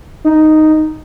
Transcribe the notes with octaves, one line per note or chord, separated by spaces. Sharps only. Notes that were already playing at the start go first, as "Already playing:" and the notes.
D#4